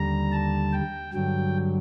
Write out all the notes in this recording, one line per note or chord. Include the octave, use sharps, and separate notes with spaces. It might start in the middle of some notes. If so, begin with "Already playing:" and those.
Already playing: D#2 D3 G3 A#5
A5
G5
G2 D3 F#3 G5